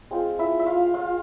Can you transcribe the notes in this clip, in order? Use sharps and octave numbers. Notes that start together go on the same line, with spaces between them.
G#3 C4 F4
E4 E5
E5
F4 F5
F4 F5